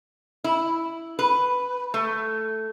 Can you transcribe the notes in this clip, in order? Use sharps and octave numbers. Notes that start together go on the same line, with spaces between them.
E4
B4
A3